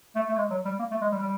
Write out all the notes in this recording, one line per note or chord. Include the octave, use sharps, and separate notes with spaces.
A3
A3
G#3
F#3
G3
A#3
A3
G#3
G3
G3